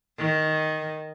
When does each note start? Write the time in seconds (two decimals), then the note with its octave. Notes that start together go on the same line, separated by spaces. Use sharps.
0.18 D#3